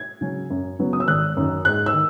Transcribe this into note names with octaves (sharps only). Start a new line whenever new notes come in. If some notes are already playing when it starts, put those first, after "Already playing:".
Already playing: G#6
C#3 F#3 C#4
F#2
C#3 F#3 B3
D#6
E6
G#1 F#6
F#2 D#3
G#2 F#6
E6
D#3